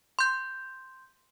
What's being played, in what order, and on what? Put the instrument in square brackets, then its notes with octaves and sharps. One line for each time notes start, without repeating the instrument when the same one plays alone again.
[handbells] C6 G6